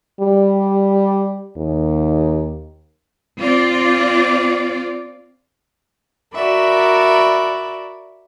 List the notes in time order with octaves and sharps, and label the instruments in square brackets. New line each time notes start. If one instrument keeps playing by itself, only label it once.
[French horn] G3
D#2
[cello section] C4 F4 D5
[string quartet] F#4 A#4 D5 E5 B5